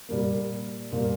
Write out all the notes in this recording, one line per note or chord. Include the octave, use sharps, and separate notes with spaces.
A#2 G3 A#3
A#2 G3 A#3